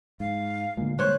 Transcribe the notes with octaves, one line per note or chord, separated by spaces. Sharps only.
G#2 F5
D2 A#2 D3 G#3
G2 D3 G#3 A#3 C5 C#5 F#6